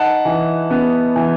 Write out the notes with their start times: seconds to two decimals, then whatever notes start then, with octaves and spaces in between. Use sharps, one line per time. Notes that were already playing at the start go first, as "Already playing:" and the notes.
Already playing: D#4 F#5 A5
0.25 E3
0.70 B3
1.16 E3